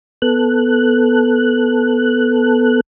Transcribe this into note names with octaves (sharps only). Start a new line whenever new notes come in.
B3 A4 F#6